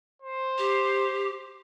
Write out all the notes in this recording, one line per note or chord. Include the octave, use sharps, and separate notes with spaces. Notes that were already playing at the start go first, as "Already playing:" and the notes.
C5
G4